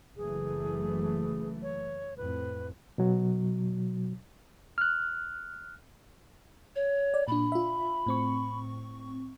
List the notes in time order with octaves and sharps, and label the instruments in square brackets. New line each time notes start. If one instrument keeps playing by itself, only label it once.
[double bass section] F#1 E3 A3 [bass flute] G#4
[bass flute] C#5
[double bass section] F2 A2 [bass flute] B4
[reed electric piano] B2 F#3
[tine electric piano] F6 F#6
[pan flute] C#5
[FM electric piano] D5
[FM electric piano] A#2 D4 [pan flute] B5
[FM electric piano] F4 E5
A2 C4 C#6